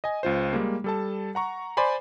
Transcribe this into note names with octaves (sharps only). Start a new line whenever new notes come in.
D#5 G#5
C#2 F4 C5
G3 G#3 A#3
G3 A4 A5
F#5 A#5 C#6
C5 D5 G#5 B5 C6